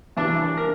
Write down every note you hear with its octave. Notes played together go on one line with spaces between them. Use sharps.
E3 D4
D4
A#4